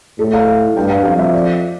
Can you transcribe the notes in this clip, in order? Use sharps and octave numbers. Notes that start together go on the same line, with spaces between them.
A2 A4
F5
G2 G5
F5
F2 F5
E5
D5